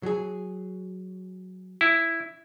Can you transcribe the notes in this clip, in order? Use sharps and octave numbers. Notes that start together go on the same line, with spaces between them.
F#3 G#4
E4